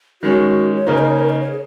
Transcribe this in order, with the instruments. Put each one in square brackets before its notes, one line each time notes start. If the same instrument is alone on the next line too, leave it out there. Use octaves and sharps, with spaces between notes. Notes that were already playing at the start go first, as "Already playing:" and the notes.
[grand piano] D#3 G#3 C#4 [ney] F#4
[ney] C#5
[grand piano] C#3 A#3 D#4 [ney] A#4
[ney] D#5
C#5
A#4
D#5
C#5
G#4